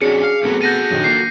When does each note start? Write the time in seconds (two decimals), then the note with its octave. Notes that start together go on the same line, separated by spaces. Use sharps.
0.01 F2 A#2 C#4 D4 F#4 G#4 C#7
0.23 F5
0.43 C2 C3 F#3 A3 B3
0.62 F#4 A4 G6 A#6 D#7
0.90 A#1 D#3 F#3
1.04 A#2 A#3 C7